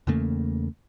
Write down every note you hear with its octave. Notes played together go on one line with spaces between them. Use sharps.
E2 C#3 A3 A#3